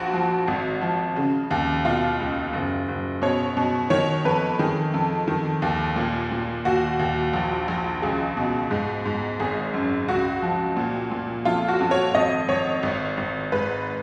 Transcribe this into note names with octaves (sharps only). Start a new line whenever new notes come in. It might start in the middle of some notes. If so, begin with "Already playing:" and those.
Already playing: A#1 F#4
F3
G#1
F3
C#3
D#2
B2 F4
C#2
F#1
F#1
B2 C#5
B2
D#3 C#5
F2 B4
D#3 G#4
F2
D#3
D#2
A#2
A#2
D#2 F#4
D#2
A#1
A#1
C#2 G#4
B2
G#2
G#2
G#1 G#4
F#2
C#2 F#4
F3
A#2
A#2
F2 F4
F#4
F2
C#5
G#1 D#5
G#1 C#5
G#1
G#1
G#2 B4